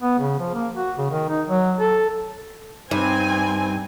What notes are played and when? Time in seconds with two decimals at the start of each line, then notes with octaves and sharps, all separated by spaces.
0.02 B3
0.19 C#3
0.39 F3
0.54 A#3
0.74 F#4
0.98 C#3
1.11 D#3
1.29 D#4
1.48 F#3
1.79 A4
2.91 G2 C4 D#4 G#5